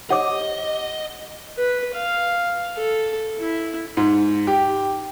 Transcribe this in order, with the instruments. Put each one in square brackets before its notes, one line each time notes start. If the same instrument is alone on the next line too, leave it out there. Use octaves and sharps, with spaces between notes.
[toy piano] G4 C#5 D6 [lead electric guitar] D#5 [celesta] F#5
[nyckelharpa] B4
F5
A4
E4
[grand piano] G#2
G4